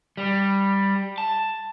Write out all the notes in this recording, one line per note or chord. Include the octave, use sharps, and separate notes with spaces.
G3
A5